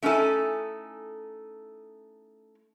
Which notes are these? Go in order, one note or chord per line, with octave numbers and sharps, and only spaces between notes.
A3 C#4 D#4 E4 A4 G#5